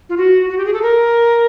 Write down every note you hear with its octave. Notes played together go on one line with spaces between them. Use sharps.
F4
F#4
F#4
G4
G#4
A4
A#4